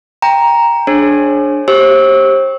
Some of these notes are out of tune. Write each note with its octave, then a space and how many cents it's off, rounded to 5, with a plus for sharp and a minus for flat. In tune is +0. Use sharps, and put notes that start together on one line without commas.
G5 +15 A#5 +5
D4 +0 G#4 +25 C#5 -45
G4 -5 C5 +40 E6 -25